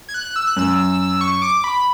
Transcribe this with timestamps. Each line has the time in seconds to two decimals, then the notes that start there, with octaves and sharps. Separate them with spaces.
0.09 G#6
0.14 F#6
0.36 E6
0.47 F#6
0.56 F#2 E6
1.21 C#6
1.42 D6
1.64 B5